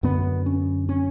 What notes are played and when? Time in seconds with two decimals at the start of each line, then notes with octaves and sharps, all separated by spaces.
0.03 F#2 D3 B3
0.46 C#4
0.89 C#4